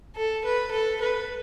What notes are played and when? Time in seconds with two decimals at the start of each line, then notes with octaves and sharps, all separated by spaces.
0.16 A4
0.45 B4
0.71 A4
1.01 B4